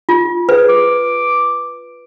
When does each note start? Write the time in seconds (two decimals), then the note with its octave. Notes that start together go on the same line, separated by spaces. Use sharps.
0.09 F4
0.49 G#4 B4
0.69 D6